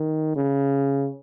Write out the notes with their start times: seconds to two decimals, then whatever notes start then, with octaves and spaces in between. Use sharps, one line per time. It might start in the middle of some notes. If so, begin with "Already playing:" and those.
Already playing: D#3
0.36 C#3